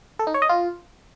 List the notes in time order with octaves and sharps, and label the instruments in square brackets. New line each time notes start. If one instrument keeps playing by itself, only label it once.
[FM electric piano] A4
D#4
C#5
D#5
F4